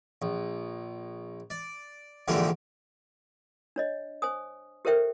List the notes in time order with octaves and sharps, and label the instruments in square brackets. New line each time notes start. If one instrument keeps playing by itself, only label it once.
[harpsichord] A#1
D5
A#1 G#2 D3 E3 A#3 G4
[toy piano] D4 C#5 D#5
C5 G#5 D#6
G4 A4 A#4 C5 E5 G5